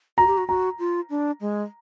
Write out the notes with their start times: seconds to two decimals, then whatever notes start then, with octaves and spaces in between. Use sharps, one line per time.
0.18 F#4 A#5
0.27 G4
0.38 F#4
0.48 F#4 A#5
0.79 F4
1.10 D4
1.41 G#3